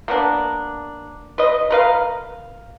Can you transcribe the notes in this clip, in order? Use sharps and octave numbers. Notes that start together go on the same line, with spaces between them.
A#3 B3 D4
B4 D#5
A#4 B4 F5